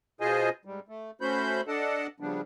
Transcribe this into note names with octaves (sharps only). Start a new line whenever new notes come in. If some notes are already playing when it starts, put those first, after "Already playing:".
B2 F4 G#4 C5 D#5 G#5
G#2 G3
A3
A3 C#4 F#4 C5 B5 G6
D4 A4 D5 D#5 F#5 A5
C#3 F3 G3 B3 D4